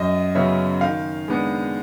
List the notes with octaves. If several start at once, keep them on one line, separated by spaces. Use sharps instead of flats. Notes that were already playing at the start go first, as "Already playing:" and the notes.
Already playing: F#2 D#5
C#3 F#3 B3 E5
D#3 F5
G#3 B3 D4